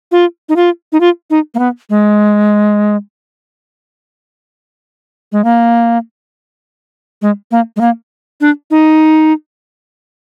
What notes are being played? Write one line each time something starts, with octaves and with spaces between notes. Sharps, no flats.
F4
D#4
F4
D#4
F4
D#4
A#3
B3
G#3
G#3
A#3
G#3
A#3
G#3
A#3
D4
D#4